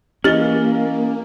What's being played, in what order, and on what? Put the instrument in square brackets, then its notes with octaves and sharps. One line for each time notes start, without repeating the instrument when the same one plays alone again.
[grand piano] E3 D#5 G7 [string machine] A#3 [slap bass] C#4 [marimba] G4 A6